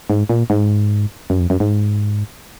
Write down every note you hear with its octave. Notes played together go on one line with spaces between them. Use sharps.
G#2
A#2
G#2
F#2
F2
F#2
G#2